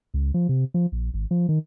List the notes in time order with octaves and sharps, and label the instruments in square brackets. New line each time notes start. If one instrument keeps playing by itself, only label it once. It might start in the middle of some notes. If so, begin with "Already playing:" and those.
[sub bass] C#2
F3
C3
F3
A#1
G#1
F3
D#3